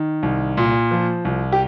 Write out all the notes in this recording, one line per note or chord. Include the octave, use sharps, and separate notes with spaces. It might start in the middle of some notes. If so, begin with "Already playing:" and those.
Already playing: D#3
C2
A#2
F3
C2
G4